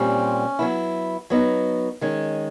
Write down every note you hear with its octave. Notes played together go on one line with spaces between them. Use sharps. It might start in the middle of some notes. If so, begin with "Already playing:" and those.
Already playing: A#2 G3 C4 C#4
F#3 B3 E4
F#3 B3 D#4
D#3 G#3 C#4